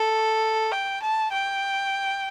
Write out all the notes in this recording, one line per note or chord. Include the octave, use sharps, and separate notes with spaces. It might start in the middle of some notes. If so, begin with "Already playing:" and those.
Already playing: A4
G5
A5
G5